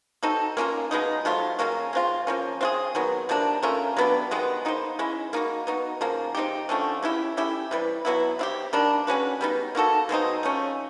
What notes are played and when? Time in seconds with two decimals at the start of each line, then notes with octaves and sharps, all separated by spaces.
0.23 C4 D#4 F#4 A4
0.57 A#3 C#4 F4 A#4
0.91 B2 G#3 B3 D#4
1.25 F#3 A3 C4 F4
1.59 C#3 F#3 A#3 C#4
1.93 G#3 C4 F4
2.27 F3 A#3 C#4
2.61 C4 F4 G#4
2.95 D#3 F#3 B3
3.29 C3 F3 A#3 D4
3.63 A3 C#4 F4 A#4
3.97 F#3 B3 D4 G4
4.31 C3 D#3 G#3 B3
4.65 A#3 D#4 G4 C5
4.99 G#3 C#4 E4
5.33 A#3 D#4 F#4
5.67 B3 D#4 F#4
6.01 C#3 F3 A#3
6.35 C4 D#4 G4
6.69 D3 F3 A3 C#4
7.02 G#3 C#4 E4 G4
7.37 A3 C#4 E4 G4
7.71 C3 E3 G3
8.05 B2 F#3 B3 E4
8.39 C4 E4 G4
8.73 D#3 G3 A#3 D4
9.07 G#3 C#4 F#4 B4
9.41 G3 B3 D#4
9.75 A#3 D#4 F#4 A4
10.09 B2 G#3 C4 D#4
10.43 F3 A3 C#4